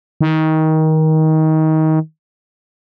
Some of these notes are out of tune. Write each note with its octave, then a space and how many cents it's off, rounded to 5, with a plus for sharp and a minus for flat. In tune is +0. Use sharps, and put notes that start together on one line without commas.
D#3 +20